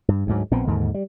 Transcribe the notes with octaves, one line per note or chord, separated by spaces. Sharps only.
G2
D2 G#2 F#3
A#1 A#2 B3 C4
D#2 G#2 D3
G3